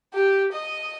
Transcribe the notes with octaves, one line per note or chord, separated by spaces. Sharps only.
G4
D#5